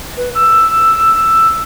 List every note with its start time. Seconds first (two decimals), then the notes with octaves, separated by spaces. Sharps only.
0.17 B4
0.35 E6